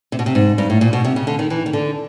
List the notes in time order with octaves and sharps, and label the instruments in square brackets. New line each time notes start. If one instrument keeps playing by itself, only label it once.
[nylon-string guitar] C3
B2
C3
G#2
G2
A2
A#2
B2
C3
C#3
D3
D#3
E3
D#3
D3